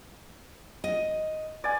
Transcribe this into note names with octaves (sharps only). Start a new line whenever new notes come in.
D#5
D5 G#5